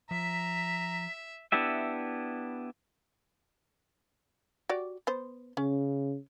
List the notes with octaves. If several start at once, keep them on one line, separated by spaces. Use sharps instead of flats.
F3 E5 A#5 B6
B3 D4 E4 G4 E5
F#4 G4 D5
B3 C5
C#3 C#4